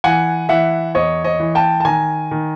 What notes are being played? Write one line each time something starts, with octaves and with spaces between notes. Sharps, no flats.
E3 F#5 G#5
E3 E5 F#5
E2 C#5 D#5
C#5 D#5
E3
G5 A5
A5
D#3 G#5 A#5
D#3